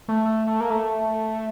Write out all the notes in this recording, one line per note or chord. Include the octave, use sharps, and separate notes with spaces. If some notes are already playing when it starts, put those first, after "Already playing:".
A3
A3
A3
A#3
A3